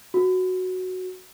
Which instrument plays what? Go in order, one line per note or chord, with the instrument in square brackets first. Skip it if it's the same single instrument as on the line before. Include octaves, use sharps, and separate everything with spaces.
[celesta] F#4